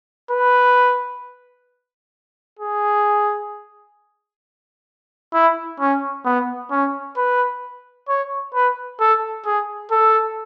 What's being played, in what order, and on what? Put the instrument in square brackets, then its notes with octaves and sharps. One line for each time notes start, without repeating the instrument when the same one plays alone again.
[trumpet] B4
G#4
E4
C#4
B3
C#4
B4
C#5
B4
A4
G#4
A4